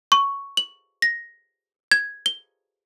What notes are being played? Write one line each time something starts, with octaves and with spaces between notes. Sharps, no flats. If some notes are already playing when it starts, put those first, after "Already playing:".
C#6
F#7
A#6
G#6
G7